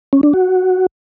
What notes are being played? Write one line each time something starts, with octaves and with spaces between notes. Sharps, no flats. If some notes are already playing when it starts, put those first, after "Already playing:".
C#4
D4
F#4